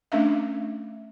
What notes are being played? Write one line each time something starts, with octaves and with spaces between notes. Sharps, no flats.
A3 C#4 D4 E5 F5